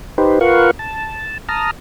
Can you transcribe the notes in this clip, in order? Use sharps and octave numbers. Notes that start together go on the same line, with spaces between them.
D#4 G4 B4 C5
F4 A#4 B4 F5 F#5 C#6
A5
A5 A#5 D#6 F6